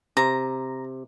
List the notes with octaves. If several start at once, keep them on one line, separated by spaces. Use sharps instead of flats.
C3 A#5